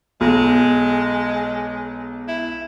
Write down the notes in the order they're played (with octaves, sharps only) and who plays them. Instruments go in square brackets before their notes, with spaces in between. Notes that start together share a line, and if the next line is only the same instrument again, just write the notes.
[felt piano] B1 [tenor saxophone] G#3
[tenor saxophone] E4